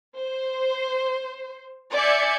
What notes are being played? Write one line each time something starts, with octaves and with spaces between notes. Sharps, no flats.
C5
D5 E5 G#5 G6 G#6 C#7